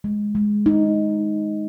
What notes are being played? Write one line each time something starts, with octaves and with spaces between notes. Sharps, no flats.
G#3
G#3
D#4